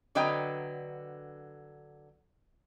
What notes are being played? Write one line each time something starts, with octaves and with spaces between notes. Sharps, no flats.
D3 F#3 B4 D#5 G5 A#5